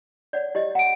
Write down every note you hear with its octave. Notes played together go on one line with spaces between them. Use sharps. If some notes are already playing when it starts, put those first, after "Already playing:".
C#5 D5 F#5
E4 G4 D#5
F#5 A#5 D7